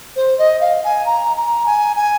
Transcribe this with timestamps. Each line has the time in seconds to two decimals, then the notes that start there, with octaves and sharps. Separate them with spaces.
0.16 C5
0.38 D#5
0.61 F5
0.84 G#5
1.06 A#5
1.37 A#5
1.66 G#5
1.96 G#5